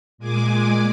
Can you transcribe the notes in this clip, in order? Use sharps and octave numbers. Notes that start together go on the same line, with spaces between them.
A#2 G#3 G#4 G#5 D6